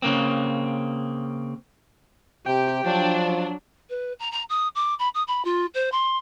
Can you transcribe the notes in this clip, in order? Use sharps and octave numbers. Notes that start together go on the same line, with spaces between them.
C#3 A#3 C4
C3 G4 G5
F3 F#3 D4
B4
A#5
A#5
D#6
D6
B5
D#6
B5
F4
C5
C6